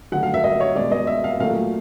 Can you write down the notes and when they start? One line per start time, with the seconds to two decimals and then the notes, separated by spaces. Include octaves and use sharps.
0.12 D3 F#3 A3 F#5
0.23 F5
0.34 E5
0.44 D#5
0.60 C#5
0.76 B2 G#3 D5
0.92 D#5
1.07 E5
1.24 F5
1.40 A#2 F#3 A3 F5